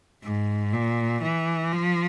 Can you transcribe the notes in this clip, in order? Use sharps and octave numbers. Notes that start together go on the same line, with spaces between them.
G#2
A#2
E3
F3